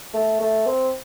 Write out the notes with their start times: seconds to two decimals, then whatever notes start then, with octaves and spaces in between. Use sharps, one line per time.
0.13 A3
0.40 A3
0.66 C4